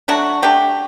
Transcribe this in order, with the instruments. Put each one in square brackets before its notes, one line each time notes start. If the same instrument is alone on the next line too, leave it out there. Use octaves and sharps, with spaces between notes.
[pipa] F#3 A3 D4 F#4
F#3 A3 D4 G4